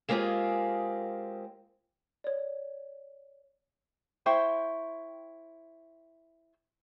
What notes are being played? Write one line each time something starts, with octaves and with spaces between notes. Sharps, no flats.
G#3 A#3 C4 F4 G4 G#4
C#5 D5
E4 C5 G5 C#6